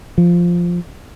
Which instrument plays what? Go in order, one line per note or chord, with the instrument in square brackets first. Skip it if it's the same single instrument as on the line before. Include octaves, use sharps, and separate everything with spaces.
[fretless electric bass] F3